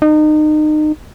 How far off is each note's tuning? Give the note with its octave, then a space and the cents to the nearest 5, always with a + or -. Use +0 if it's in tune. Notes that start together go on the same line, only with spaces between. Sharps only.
D#4 -30